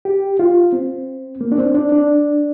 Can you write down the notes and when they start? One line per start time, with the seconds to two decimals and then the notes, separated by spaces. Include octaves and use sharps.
0.05 G4
0.39 F4
0.73 C4
1.41 A#3
1.52 D4
1.58 C4
1.75 D4
1.92 D4